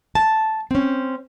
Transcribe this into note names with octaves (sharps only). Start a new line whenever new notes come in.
A5
C4 C#4